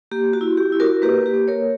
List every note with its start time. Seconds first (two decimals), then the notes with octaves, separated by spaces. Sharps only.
0.11 A#3 G4
0.33 F#4
0.41 E4
0.57 G4
0.72 E4
0.80 F#4 A#4
1.02 A#3 G4 B4
1.26 G4
1.33 A#3
1.48 A#4 C#5